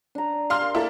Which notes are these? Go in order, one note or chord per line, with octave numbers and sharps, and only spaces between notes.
D4 A#5
G4 F5 C6 F6
A#4
A#3 E4 A4